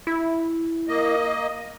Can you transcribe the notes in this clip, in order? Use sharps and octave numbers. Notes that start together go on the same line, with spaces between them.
E4
A#3 D#5